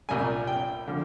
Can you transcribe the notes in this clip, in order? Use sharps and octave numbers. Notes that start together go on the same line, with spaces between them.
C2 A#2 G3 G#5
G5
D3 F3